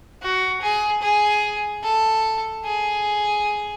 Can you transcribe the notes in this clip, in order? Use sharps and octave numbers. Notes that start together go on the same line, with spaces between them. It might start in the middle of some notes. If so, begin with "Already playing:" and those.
F#4
G#4
G#4
A4
G#4